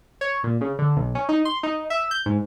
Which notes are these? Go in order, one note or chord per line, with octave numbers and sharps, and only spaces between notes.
C#5
A#2
C#3
D3
B1
C#4
D#4
C6
D#4
E5
G6
G#2